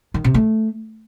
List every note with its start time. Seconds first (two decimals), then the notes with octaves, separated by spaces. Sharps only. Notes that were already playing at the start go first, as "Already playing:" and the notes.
0.14 D#3
0.24 C3
0.34 A3